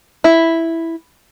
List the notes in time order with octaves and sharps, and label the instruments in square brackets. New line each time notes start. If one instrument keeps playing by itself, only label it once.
[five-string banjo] E4